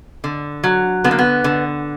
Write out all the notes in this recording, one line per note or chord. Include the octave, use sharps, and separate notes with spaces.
D3
F#3
D3 B3
A#3
B3
D3